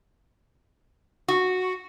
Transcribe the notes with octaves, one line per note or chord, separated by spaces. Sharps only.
F#4